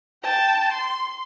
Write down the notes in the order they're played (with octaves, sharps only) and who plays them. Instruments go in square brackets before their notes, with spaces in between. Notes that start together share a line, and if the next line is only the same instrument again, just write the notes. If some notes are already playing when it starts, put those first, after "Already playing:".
[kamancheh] G5 A5
C6